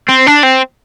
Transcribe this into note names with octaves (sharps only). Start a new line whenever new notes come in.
C4
D4
C4